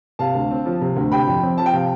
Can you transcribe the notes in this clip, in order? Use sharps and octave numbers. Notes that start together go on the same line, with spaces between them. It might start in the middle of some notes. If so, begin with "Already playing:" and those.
C3 F5 A5
D2
C4
F3
C3
D2
C3 G5 B5
F2
C4
F3 A5
G5
C3 F5